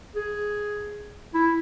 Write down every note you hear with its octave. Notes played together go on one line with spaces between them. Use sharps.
G#4
E4